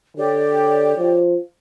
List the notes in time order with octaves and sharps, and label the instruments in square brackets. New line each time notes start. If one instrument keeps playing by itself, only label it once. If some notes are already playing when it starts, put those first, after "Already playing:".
[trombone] D3 [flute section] G4 C#5 D5
[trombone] F3